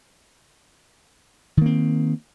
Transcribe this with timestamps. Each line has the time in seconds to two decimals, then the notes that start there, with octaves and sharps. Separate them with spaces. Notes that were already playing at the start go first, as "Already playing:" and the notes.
1.57 D#3
1.62 A#3
1.66 C4